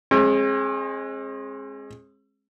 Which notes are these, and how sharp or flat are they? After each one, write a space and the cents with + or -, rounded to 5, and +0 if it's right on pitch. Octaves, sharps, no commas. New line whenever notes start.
G#3 +0 C4 +45